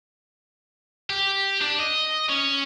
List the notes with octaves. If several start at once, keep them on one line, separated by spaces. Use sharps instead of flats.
G4
D4
D#5
C#4